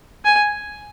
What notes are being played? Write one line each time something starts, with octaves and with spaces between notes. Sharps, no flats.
G#5